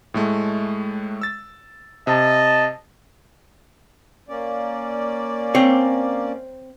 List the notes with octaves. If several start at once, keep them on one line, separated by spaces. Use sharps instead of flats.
A2 G#3 A3
E6 A6
C3 D#5 A5
A#3 C#4 D5
C4 C#5